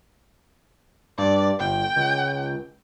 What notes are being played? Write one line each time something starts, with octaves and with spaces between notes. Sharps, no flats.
G2 D5
G1 G5
C#2